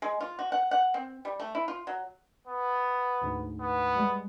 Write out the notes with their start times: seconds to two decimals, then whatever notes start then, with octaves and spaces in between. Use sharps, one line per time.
0.02 G#3
0.20 F4
0.39 F#4
0.52 F#5
0.71 F#5
0.94 C4
1.25 G3
1.40 A3
1.55 E4
1.68 F4
1.87 F#3
2.47 B3
3.21 D2 G#2
3.60 B3
3.95 G3 G#3